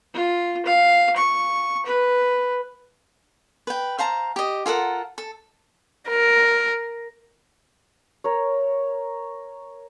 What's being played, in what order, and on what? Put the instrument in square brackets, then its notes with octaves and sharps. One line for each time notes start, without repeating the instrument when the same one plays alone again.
[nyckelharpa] F4
F5
C#6
B4
[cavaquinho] B4 G5
C5 F5 A5 A#5
G4 D#5
F4 A4 A#4 F#5
A4
[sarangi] A#4
[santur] A#4 C#5